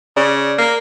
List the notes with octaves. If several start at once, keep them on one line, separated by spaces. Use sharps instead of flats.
C#3 D5
A#3